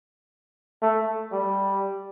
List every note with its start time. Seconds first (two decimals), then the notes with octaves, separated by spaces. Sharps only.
0.82 A3
1.32 G3